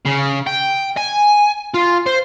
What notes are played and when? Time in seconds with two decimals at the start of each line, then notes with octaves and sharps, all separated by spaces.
0.06 C#3
0.47 G5
0.97 G#5
1.74 F4
2.06 C5